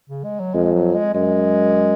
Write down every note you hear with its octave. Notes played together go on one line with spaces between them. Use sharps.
C#3
G#3
F#3
F2 G#3
F#3
G#3
F#2 G#3